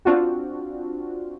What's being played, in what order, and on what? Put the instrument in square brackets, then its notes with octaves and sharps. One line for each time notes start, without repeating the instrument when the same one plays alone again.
[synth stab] C4 D4 F4 F#4